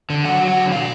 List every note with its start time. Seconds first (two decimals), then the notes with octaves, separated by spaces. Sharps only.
0.10 D3
0.25 F#3 F#5
0.41 F#3
0.48 F#5
0.56 D3
0.71 B2 F5